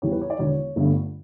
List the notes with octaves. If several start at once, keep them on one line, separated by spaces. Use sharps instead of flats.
E2 C#3 E3 G3 C#5
B4
C#5
D5
E1 E2 D3 C#5
G1 G2 D3 A3